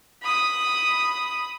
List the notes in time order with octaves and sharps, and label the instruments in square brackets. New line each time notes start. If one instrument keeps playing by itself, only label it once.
[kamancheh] B5 D#6